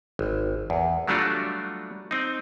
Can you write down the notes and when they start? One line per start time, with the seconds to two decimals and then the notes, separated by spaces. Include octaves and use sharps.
0.19 G#1
0.70 E2
1.08 F#3 G3 A3 D4 F4 F#4
2.11 C4 D#4